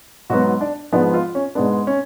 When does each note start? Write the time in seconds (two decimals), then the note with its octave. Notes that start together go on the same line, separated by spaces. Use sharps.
0.30 G#2 F#3 B3 F#4
0.61 D4
0.92 G#2 F3 G#3 B3 D4
1.14 F4
1.35 C#4
1.55 G#2 G#3 B3 D4
1.87 C#4